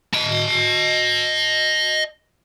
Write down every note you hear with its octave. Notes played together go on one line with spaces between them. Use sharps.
D#5 A5